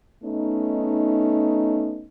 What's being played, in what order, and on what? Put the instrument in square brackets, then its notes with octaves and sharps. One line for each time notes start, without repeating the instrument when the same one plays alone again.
[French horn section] A3 B3 C#4 D#4